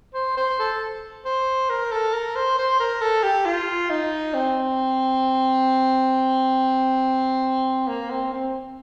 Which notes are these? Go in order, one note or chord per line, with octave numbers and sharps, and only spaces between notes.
C5
C5
A4
C5
A#4
A4
A#4
C5
C5
A#4
A4
G4
F4
D#4
C4
A#3
C4
C4